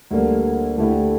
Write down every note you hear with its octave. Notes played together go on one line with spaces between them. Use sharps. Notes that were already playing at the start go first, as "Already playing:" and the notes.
D2 D3 G3 A#3
D2 D3 A3 E4 G4